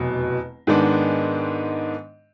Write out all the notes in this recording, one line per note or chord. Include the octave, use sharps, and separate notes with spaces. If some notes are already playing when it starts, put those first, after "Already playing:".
Already playing: F1 E2 B2 F#3
G#2 D#3 G#3 B3 D4